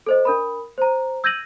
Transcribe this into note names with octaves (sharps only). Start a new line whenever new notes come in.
A4 C5 D#5
D4 A#4 B5
C5 A#5
E6 G6 G#6 A#6 D#7 F#7